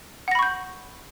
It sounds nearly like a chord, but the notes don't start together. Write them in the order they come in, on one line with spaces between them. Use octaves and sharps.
F#5 A#6 B5 C#6 G6